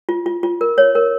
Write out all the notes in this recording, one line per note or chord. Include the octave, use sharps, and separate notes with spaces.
F4
F4
F4
A#4
C#5
A#4